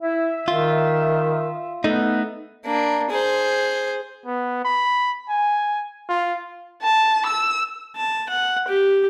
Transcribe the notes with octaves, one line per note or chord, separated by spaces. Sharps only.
E4 E5
D#3 F4
A3 B3 D#4
A#3 D4
G#4 C5
B3
B5
G#5
F4
A5
E6
A5
F#5
G4